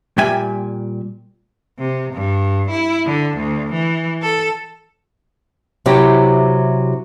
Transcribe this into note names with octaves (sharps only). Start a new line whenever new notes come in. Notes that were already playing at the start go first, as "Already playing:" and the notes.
A#2 G3 E5 G5 G#5
C3
G2
E4
D3
D2
E3
A4
C3 F#3 C4 E4 G4